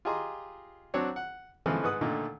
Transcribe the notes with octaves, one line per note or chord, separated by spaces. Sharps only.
F4 G4 G#4 D#5 A#5 C6
F#3 C4 D4 F#4 C#5
F#5
C#3 E3 F3 G#3 A3 C4
G#2 B4 F#5 D#6
A#2 D3 D#3 A3